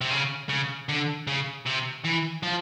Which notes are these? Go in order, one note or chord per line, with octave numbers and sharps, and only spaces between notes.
C3
C#3
C#3
D3
C#3
C3
E3
F3